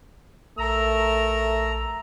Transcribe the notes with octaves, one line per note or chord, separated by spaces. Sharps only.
A#1 A3 A#4 A5 A#5 E6